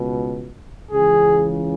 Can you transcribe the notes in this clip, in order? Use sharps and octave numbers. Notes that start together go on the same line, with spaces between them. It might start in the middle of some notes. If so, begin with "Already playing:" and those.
Already playing: C#2 B2
C#2 C#3 E3 G#4